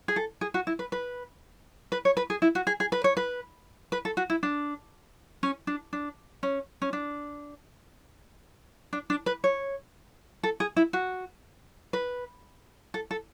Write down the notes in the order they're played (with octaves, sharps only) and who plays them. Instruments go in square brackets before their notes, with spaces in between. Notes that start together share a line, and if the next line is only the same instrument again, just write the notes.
[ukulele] G#4
A4
G#4
F#4
E4
B4
B4
B4
C#5
B4
G#4
E4
F#4
G#4
G#4
B4
C#5
B4
B4
A4
F#4
E4
D4
C#4
D4
D4
C#4
C#4
D4
D4
D4
B4
C#5
A4
G#4
E4
F#4
B4
A4
A4